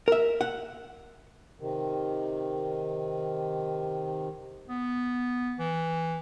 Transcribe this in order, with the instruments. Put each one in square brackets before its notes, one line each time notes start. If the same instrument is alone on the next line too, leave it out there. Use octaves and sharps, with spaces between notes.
[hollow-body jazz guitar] A#4 E5
F#5
[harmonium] C3 D#3
[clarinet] B3
E3